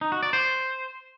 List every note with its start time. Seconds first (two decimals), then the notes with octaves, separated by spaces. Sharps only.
0.01 D#4
0.12 F#4
0.23 D5
0.33 C5